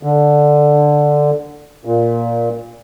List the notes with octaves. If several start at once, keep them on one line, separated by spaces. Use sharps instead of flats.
D3
A#2